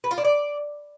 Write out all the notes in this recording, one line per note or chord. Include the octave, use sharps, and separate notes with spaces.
B4
F4
D4
D5